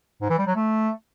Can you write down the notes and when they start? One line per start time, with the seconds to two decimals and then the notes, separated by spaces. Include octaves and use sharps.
0.22 G#2
0.30 E3
0.38 G3
0.47 F#3
0.55 A3